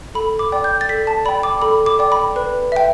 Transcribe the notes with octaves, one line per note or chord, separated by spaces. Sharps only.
A4 B5
D6
D5 G5
G6
A6
A4 B6
A5
D5 G5 B5
D6
A4 B5
D6
D5 G5
B5
B4
E5 G5